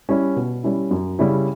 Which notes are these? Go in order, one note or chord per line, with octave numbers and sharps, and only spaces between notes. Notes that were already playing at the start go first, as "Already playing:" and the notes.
G3 C#4 E4
B2
G3 C#4 E4
F#2
C#3 G3 C#4 E4